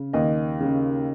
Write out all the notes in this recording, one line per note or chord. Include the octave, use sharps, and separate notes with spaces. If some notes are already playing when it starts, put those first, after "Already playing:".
Already playing: C#3
D#2 D#5
C#3